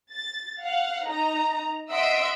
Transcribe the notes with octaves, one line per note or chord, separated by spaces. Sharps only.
A6
F5 F#5
D#4 A#5
D#5 E5 F#5 C6 E6 D7